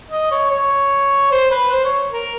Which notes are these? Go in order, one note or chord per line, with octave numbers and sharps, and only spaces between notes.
D#5
C#5
C#5
C5
B4
C5
C#5
A#4